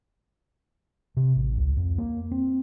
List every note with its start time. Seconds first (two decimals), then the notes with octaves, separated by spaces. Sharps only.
1.17 C3
1.35 A1
1.58 C#2
1.77 F2
1.98 A#3
2.32 C4